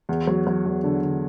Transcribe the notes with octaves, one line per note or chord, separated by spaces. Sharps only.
E2
F#3
F#3
E2
D3
D3